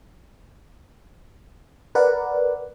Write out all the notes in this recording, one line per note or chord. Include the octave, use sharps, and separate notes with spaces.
A#4 B4 D5 F#5